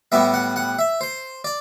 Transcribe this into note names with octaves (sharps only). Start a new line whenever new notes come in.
A2 G3 B3 E5
F#5
F#5
E5
C5
D5